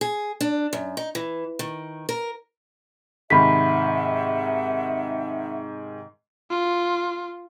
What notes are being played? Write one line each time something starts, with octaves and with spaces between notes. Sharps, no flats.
G#4
D4
F#2
D#4
E3
D#3
A#4
G#2 C3 D#3 E5 F#5 B5 B6
F4